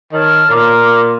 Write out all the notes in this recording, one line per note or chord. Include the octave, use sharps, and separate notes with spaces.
D#3 C#5 A5 F6
A#2 A#5 D6 F6